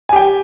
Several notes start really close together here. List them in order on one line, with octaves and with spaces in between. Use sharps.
G#5 G4 G5